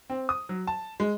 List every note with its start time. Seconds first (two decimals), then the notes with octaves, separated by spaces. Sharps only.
0.10 C4
0.29 D#6
0.49 F#3
0.67 A5
1.00 G#3